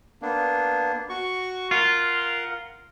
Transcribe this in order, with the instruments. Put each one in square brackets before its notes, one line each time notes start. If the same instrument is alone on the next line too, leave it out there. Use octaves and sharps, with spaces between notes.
[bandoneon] A#3 B3 D4
F#4 C#6
[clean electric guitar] F4 [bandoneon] A#4 F#5